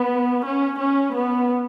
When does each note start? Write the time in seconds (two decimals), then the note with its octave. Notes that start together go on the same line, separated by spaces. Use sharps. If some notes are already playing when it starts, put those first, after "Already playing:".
Already playing: B3
0.44 C#4
0.79 C#4
1.14 B3